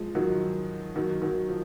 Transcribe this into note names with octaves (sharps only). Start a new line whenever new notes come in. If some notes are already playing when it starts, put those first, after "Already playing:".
Already playing: F3 G#3
D#3 F#3
D#3 F#3
D#3 F#3
F3